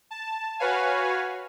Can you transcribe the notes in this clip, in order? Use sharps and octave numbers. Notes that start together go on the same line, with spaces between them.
A5
F#4 B4 C#5 F5 G#5